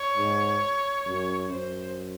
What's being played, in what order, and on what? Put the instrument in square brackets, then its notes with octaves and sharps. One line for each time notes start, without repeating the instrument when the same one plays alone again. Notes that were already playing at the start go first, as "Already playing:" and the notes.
Already playing: [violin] C#5
[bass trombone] G#2
F#2
[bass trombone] F#2 [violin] C5